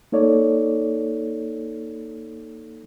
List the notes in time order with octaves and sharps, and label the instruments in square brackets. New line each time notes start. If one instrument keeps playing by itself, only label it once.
[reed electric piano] A#3 D#4 A4 C#5 D5